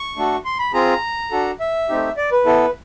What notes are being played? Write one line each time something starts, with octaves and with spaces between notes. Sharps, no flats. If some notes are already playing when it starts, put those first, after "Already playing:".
Already playing: C#6
A3 D4 F#4 A4
C6
B5
C4 F4 G#4 A#5
D4 F#4 A4
E5
A3 C4 D#4 G4
D5
B4
B3 E4 A4